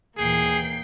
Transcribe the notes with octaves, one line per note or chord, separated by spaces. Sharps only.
D#2 A#2 E3 A#3 G#4 G5 C7